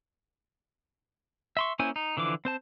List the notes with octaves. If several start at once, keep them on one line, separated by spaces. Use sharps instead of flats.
E5 C6 C#6
A#3 C#4 E4 C5 G#5
D#4
D3 E3 F3 D6
C4 C5 A5